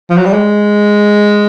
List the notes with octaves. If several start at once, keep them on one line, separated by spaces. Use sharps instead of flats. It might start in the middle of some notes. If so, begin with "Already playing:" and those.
F3
F#3
G3
G#3